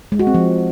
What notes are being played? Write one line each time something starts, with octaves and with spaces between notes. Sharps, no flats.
G#3
F#4
C4
F3